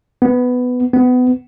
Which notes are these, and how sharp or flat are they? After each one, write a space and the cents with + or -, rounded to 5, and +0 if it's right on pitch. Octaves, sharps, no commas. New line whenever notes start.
B3 +10
B3 +25